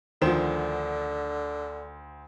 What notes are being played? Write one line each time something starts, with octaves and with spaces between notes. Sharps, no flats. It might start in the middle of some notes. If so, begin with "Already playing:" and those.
D2 D3 D#3 F3 C5 E7